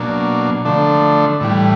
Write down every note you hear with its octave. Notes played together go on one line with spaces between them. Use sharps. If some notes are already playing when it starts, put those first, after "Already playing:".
Already playing: B2 F#3 A#3 D4
D3 F3 A3 D4
A2 E3 G3